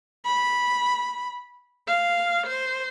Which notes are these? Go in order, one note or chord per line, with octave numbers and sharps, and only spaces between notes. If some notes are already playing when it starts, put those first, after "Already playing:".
B5
F5
C5